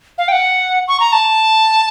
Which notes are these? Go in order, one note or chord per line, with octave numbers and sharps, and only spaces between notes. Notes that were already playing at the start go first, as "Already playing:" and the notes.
F5
G5
F#5
C#6
A#5
A5